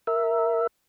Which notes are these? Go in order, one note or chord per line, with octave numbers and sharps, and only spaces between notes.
A#4 E5